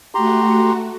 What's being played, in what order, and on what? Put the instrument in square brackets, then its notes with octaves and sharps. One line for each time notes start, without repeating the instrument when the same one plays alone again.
[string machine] A3 F#4 [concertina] G4 A#5 C6